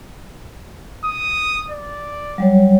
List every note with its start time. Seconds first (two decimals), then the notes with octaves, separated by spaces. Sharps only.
1.05 D#6
1.70 D5
2.38 F#3 G3 C#5